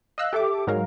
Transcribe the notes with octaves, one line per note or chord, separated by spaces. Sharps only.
D#5 F5 E6 F#6
G4 A4 E5 D6
G#2 F#3 G#3 A#4 F5